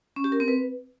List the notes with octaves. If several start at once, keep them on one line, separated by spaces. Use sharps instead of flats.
C#4
G4
A#4
C4
B4